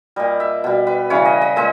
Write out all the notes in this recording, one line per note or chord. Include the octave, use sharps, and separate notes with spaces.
A#2 G3 D#5
E5
B2 G3
B4
C#3 E3 G3 C#5
D#5
D#5
A#2 G#3 D#5